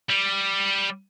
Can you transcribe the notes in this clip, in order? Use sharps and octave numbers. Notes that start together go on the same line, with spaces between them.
G3